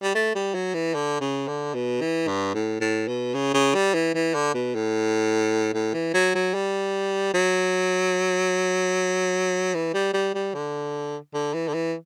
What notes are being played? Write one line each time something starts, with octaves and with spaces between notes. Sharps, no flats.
G3
A3
G3
F#3
E3
D3
C#3
D3
B2
E3
G2
A2
A2
B2
C#3
C#3
G3
E3
E3
D3
B2
A2
A2
E3
F#3
F#3
G3
F#3
E3
G3
G3
G3
D3
D3
E3
D3
E3